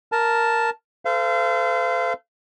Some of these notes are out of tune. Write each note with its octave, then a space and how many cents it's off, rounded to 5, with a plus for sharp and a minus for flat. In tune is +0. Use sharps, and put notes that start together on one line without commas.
A#4 +0 A5 +0
A4 +0 C5 -35 F5 -30